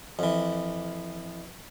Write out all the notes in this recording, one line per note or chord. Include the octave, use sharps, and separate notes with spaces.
F2 E3